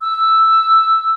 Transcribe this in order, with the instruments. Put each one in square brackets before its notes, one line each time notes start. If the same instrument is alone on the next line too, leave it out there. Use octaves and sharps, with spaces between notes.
[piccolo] E6